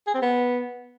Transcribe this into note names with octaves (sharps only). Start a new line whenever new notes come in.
G#4
C4
B3